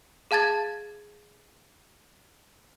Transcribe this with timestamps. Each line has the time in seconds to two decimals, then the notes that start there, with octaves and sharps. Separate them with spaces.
0.31 G#4 F5 A5 G#6 A6